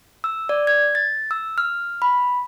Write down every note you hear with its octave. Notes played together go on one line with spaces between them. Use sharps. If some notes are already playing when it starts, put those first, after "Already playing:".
E6
D5
G#6
A6
E6
F6
B5